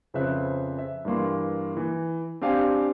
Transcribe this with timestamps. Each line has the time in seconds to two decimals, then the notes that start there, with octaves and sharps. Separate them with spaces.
0.14 F2 C#3 B4 C5 E5 F#6
0.79 E5
1.05 G2 E3 A#3 C6
1.77 E3
2.41 C4 D4 G4 F5 G#5